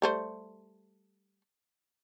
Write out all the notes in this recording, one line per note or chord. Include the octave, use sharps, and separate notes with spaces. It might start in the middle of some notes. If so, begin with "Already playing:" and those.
G3 A3 C5